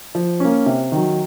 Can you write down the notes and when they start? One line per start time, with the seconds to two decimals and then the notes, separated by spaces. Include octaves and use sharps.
0.15 F3
0.40 A#3 C#4
0.66 C3
0.92 D#3 F#3